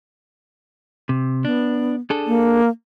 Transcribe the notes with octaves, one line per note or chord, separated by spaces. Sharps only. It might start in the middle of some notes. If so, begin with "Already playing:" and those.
C3
B3 D4
D4 G#4 A4
A#3